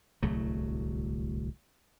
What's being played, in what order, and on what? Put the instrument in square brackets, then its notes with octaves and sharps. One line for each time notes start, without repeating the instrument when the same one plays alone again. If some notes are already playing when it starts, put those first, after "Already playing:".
[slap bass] D1 C2 F#3 A3